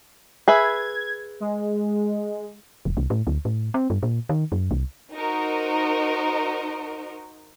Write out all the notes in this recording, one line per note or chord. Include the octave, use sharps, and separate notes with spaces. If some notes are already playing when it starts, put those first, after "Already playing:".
G#4 B4 E5 G#6
G#3
E1
C2
A2
D2
A2
C4
G2
A#2
D#3
F#2
C2
D#4 F#4 A#4 C5 D#5